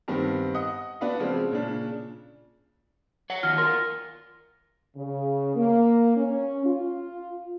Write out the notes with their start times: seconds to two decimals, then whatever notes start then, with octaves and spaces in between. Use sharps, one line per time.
0.08 G2 D#3 B3 C4 G4
0.54 D#5 F#5 D#6
1.01 B3 D4 F#4 B4 D5 F5
1.20 C#3 F3 G#3 C4
1.51 A#2 C#3 D4
3.30 C#5 F#5
3.43 D#3 F4 F#4 F6
3.58 F4 A#4 C6
4.97 C#3
5.56 A#3
6.16 C#4
6.65 F4